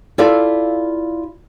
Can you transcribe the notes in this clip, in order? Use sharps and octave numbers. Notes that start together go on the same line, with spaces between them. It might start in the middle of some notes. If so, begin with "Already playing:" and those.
E4 F4 A4 D5 E5 F5